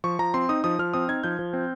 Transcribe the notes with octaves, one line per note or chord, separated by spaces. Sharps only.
F3 C#6
F3 A#5
C4 C6
D#4 D#6
F3 D#6
F3 F6
C4 D#6
D#4 G#6
F3 G6
F3
C4